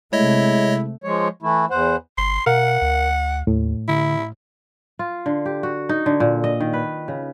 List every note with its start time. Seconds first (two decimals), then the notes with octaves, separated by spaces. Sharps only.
0.13 C3 G#3 A3 E4 C#5 D#5
1.04 F3 G#3 C#5
1.42 E3 A3 E4
1.71 E2 C5 F#5
2.17 G1 C6
2.46 B2 A#4 F5 F#5
2.81 D2
3.47 D#2 A2
3.88 D3 E4
4.99 F4
5.26 D3
5.46 G4
5.63 F#4
5.89 D#4
6.06 D3
6.20 A#2
6.44 D#5
6.60 D#3
6.73 B4
7.08 C#3